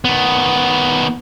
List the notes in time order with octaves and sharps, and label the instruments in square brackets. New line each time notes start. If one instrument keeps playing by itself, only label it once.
[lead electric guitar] D#3 B3